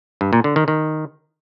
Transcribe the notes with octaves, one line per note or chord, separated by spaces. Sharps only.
G2
A#2
D3
D#3
D#3